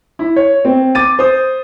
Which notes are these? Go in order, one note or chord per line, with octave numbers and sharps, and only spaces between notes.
E4
C#5
C4
D6 A6 D#7
C5 D#6